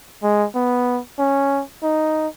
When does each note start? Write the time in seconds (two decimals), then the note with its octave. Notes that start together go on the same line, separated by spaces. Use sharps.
0.23 G#3
0.55 B3
1.19 C#4
1.83 D#4